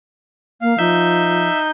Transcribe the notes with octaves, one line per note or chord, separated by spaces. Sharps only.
A#3 F5
F3 D#4 E5 G6